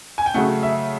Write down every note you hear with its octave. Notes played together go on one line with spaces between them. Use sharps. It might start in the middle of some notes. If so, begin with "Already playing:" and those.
G#5
G5
C#3 F#3 A3 F#5
E5